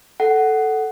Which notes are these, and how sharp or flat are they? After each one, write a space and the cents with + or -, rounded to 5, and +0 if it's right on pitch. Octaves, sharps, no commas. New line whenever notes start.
A4 +0 F#5 +10